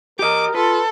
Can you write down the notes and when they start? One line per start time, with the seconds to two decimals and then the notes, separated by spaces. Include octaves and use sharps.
0.19 G4 A#4 D#5 D6
0.55 F4 A4 B4